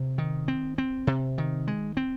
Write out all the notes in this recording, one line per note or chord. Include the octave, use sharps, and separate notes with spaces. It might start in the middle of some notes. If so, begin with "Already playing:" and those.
Already playing: C3
D#3
C4
C4
C3
D#3
G#3
C4